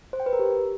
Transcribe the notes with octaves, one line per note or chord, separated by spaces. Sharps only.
C5
G5
B4
A#4
G4